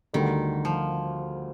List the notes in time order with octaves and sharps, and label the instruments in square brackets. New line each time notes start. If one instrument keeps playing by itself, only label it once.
[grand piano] D2 D3 G3 [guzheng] D#3
[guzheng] F3